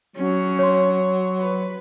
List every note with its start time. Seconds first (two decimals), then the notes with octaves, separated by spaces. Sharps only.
0.16 F#3 C#4
0.59 C#5 C6
1.40 B4